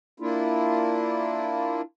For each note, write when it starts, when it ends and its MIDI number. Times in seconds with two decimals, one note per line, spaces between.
0.20 1.82 58
0.20 1.82 62
0.20 1.82 64
0.20 1.82 65